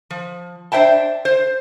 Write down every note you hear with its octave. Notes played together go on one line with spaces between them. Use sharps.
F3
D4 C5 E5 G5 A5
C5